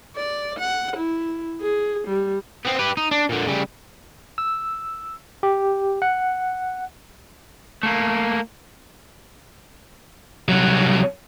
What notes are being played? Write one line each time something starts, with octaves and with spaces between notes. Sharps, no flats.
D5
F#5
E4
G#4
G3
B3 C4
G4 B4
D#4
D4
A#2 D3
C#3 G3
E6
G4
F#5
A3 A#3
C2 F#3